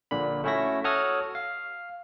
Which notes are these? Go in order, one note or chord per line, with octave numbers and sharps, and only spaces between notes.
A#1 A#2 D3 B5
A3 C#4 E4 F#4 E5 A#6
F#4 A4 C#5 D#6 F6
F5